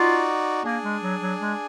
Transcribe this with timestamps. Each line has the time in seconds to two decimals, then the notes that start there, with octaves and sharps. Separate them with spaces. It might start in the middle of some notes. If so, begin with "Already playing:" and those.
Already playing: D#4 F4 F#4 D5
0.64 A#3 D4 G#4 D5 G#5
0.83 G#3
1.02 F#3
1.21 F#3
1.40 G#3